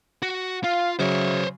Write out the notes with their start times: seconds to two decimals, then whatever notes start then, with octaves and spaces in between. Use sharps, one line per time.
0.22 F#4
0.64 F4 F5
0.99 C#3 F#3 C5 C#5 E5